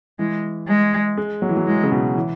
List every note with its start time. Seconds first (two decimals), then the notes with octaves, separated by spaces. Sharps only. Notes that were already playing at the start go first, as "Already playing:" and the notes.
0.19 E3 G#3
0.68 G#3
1.17 G#3
1.42 F#3
1.49 E3
1.57 F#3
1.66 E3 G#3
1.83 C#3
1.92 B2
2.16 E3